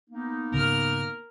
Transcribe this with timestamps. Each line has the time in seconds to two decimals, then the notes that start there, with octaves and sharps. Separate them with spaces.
0.10 A#3 B3 D#4
0.52 G#2 C#3 C4 A#4 F6